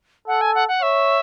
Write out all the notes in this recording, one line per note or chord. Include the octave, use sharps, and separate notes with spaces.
A4 F#5
G#5
F#5
F#5
C#5 E5